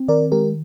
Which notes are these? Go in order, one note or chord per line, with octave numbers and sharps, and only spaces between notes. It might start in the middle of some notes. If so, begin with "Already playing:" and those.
Already playing: C4
D#3 A#4 D5
G#3 G4 A#4